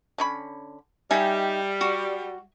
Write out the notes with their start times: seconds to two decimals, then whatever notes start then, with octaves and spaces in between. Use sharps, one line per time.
0.18 D3 C#4 B5
1.11 G3 D#4 D#5 E5 G5 G#5
1.81 F#4